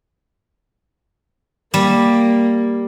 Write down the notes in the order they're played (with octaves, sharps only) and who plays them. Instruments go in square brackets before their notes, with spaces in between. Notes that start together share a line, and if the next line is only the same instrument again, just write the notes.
[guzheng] G3 [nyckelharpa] A#3